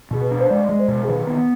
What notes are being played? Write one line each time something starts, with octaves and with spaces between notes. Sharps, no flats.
B2 G#4
B4
D4
C5
G#3 D5
G#3
C5
B2
G#4
D#3 B4
B3